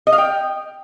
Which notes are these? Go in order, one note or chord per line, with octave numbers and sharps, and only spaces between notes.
D#5
F5
G5